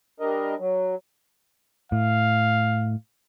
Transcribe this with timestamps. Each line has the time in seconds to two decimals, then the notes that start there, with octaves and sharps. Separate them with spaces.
0.20 G3 D4 A#4 D#5
0.59 F#3
1.92 A2 F5